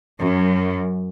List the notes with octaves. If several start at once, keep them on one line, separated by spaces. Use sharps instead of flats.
F#2